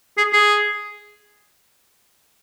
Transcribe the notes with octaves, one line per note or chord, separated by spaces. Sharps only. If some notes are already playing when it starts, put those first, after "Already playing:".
G#4
G#4